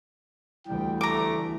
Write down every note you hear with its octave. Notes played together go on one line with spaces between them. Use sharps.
D2 E3 G3 G5
A3 A#5 D6